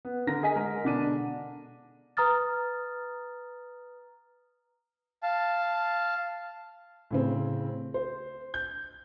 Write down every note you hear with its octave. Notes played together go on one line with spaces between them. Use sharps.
B3
D3 A#4 A#6
G#4 D#5 G#5 B6
G#3 A#4
B2 D3 D4 D#7
B4 A#5 D#6 F6 A6
F5 A5
A2 C#3 C4
C5
G6